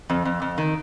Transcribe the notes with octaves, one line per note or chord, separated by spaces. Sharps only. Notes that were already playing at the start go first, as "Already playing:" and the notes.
F2
F2
F2
D#3